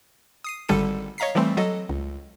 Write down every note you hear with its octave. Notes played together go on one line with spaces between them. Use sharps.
D#6 C7 D#7
G#1 D3 G3 A4 C#7 D#7
C#5 D#5 F5 A#5 B6 C7
E3 G3 A3 C4
F#3 A4 D#5
C#2